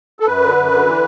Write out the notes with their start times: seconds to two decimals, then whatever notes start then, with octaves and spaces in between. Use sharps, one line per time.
0.20 A4
0.26 F#2 B4
0.42 D3
0.57 F#2
0.72 D3
0.85 E3